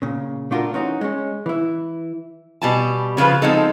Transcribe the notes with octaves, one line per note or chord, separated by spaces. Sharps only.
A#2 C#3
A3 D4 F4 F#4 A4 A#4
E3 C#4 D#4 F#4
G#3 C#4
E3 E4
B2 G3 G4 G#5 A5
C#3 F3 A#3 F4 B4
F3 G#3 B3 C4 D#4 A4